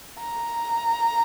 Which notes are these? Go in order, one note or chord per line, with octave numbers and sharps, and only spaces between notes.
A#5